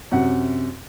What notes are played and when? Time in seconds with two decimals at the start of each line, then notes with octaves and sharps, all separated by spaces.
0.11 F#2 C3 F#5